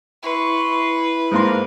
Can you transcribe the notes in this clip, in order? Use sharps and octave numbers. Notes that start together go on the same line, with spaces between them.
E4 B4 C6 C#6
G#2 A#3 D4 A#4 C6